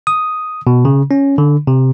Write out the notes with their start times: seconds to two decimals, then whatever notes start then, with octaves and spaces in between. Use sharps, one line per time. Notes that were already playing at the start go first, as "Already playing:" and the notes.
0.07 D#6
0.67 B2
0.85 C#3
1.11 C#4
1.38 D3
1.67 C3